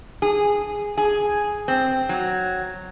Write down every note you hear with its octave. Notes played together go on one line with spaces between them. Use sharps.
G#4
G#4
C4
F#3